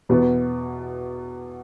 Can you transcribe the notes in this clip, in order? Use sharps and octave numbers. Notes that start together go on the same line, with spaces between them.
E2 B2 B3